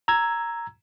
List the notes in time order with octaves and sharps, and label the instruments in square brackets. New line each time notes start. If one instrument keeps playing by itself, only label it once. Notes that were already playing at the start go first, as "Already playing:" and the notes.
[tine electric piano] A#5 E6 G#6